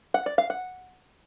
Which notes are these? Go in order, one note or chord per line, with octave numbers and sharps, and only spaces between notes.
F#5
D5
F5
F#5